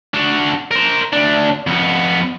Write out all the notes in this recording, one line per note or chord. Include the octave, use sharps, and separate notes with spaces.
D4 F#4
A#4 C5
D2 D4
F2 B3